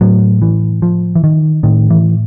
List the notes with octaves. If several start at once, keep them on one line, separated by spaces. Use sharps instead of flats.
A2 F#3
E3
F3
E3
D#3
A2 D#3
E3